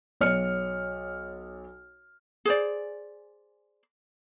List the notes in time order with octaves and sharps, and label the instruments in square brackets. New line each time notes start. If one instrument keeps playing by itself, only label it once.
[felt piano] B1 C#5 F6 C#7
[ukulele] G#4 C5 D5